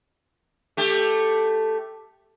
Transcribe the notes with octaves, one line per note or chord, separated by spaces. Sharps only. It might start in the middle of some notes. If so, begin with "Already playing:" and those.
A3 G4